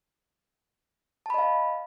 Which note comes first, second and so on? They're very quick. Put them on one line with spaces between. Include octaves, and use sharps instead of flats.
A5 B5 D#5 F5